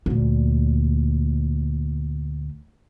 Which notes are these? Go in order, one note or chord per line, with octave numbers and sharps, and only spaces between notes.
D2 A#2